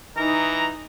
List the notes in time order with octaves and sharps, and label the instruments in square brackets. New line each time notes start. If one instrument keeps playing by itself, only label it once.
[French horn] E3 [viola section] D#4 [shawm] A#5